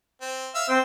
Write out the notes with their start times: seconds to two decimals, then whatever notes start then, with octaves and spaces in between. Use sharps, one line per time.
0.21 C4
0.55 E5 F5 E6
0.69 C4 G5